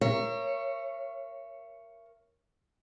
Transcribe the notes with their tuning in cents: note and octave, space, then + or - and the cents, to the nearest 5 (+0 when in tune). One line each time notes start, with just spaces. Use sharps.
A#4 +0 C#5 +0 E5 +40